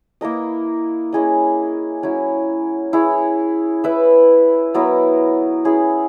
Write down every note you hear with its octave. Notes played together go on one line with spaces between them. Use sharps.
A#3 E4 A#4 D#5
C#4 E4 G#4 D#5
F#3 C#4 E4
E4 G#4 C#5
E4 B4 E5
F#3 B3 E4 A#4
C#4 E4 G#4